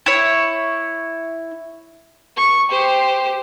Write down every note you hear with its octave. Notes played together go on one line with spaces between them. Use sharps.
E4 C#5
C#6
G4 C5